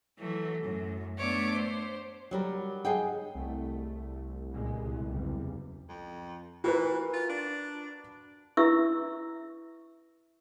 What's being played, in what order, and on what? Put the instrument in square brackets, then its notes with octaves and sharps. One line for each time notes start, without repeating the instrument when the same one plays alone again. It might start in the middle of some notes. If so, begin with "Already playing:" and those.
[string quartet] E3 F#3 A3
F#2 A2
A3 B3 D4 C#5 D6
C5
[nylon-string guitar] F#3 G3 A#4
G#4 D#5 F#5 G5
[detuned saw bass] C2 [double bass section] A3
[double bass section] C#2 A#2 G#3
F#1 E2 G3
[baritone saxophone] F2
[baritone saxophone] E3 [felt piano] F#4 A#4 B4
[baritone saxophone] F4
D4
[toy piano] E4 B4 E5 C#6 E6